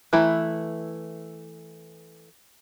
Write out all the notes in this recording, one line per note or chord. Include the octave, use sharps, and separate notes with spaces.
E3 A3 E4 A#5